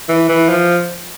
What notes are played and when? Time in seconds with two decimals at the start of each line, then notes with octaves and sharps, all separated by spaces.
0.09 E3
0.29 E3
0.49 F3